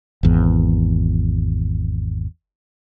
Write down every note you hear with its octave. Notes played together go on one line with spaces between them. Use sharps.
G#1 E2